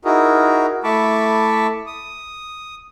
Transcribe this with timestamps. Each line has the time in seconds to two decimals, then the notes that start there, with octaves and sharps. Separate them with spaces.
0.05 D#4 E4 F#4 G#4 A#4
0.84 A3 E4 A5 B5 C#6 D6
1.87 D#6